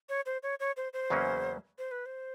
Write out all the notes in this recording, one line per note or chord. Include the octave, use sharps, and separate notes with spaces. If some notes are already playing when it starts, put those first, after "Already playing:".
C#5
C5
C#5
C#5
C5
C5
E2 C#3 F#3 A#3 C#4
C5
B4
C5